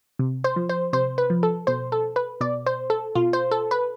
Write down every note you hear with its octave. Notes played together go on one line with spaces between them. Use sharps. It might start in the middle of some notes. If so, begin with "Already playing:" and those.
C3
C5
F3
C5
C3 C5
B4
F3
A4
B2 C5
A4
B4
B2 D5
C5
A4
B2 F4
C5
A4
B4